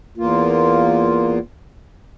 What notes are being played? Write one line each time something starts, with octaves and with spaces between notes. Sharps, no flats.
E2 A#3 F4